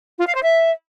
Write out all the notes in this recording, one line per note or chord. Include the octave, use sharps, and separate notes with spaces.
F4
F5
C5
E5